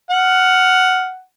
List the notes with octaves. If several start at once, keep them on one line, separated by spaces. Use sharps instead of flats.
F#5 F6